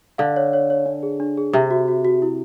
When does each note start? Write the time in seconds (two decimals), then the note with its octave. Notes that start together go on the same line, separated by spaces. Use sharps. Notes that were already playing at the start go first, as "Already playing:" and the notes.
0.18 D3 F5
0.36 C#5
0.53 C#5
0.70 C#5
0.86 D4
1.03 G#4
1.20 D4
1.37 G#4
1.53 C3 E5
1.71 F#4
1.88 F#4
2.05 F#4
2.22 E4